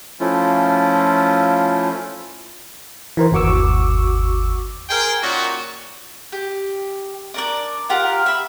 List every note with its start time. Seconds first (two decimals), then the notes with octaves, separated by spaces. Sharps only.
0.20 F3 A3 C#4 E4 F4
3.17 E3 A#4 C5
3.32 G1 D#2 F#4 C#6 D6 E6
4.89 G#4 A#4 C5 G5
5.21 A#2 C#4 D#4 F#4
6.32 G4
7.34 D4 A#4 D5
7.89 F4 G4 A#4 F#5
8.26 E5 B5